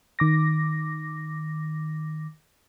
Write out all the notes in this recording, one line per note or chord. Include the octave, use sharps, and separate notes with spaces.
D#3 D6 A#6